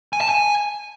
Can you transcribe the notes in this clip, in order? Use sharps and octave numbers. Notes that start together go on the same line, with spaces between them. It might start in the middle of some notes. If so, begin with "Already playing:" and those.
G#5
A5
G#5